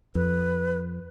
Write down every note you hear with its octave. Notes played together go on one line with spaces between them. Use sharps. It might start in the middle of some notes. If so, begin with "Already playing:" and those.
F2 B4